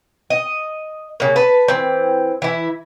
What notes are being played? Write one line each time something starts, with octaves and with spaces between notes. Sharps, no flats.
D#5
C#3 A#3
B4 A5
E3 C4
E3 E4